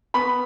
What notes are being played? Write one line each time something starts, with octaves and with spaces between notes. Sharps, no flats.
B3 B5